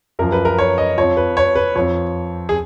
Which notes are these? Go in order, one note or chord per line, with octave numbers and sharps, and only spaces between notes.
F#2 F3 A#4
B4
A#4
C#5
D#5
F2 F3 C#5
B4
C#5
B4
F2 F3 C#5
G#4